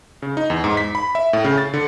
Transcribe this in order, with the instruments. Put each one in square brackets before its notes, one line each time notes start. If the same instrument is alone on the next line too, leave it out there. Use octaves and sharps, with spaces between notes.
[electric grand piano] C#3
D#4
E2
G#2
B6
B5
E5
A2
C#3
A6
D3